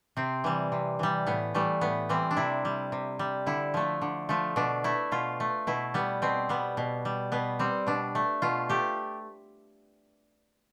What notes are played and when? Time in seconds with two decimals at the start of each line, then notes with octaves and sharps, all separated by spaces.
0.17 C3 C4
0.44 E3 G3
0.72 C3
0.99 E3 G3
1.27 A2 B3
1.54 E3 G3 A3
1.81 A2 B3
2.09 E3 G3 C4
2.31 D4
2.37 C3 E4
2.65 G3
2.92 C3
3.19 G3
3.46 D3 E4
3.74 F3 A3
4.02 D3
4.29 F3 A3
4.56 B2 D4
4.84 A3 E4
5.12 B2 F4
5.40 A3
5.67 B2 E4
5.94 G3 B3
6.22 B2 C4
6.49 G3 B3
6.77 B2
7.05 G3
7.32 B2 B3
7.59 G3 C4
7.87 B2 D4
8.15 A3
8.42 B2 F4
8.69 A3 G4